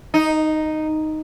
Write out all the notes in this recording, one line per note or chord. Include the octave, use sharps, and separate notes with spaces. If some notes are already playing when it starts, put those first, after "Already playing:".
D#4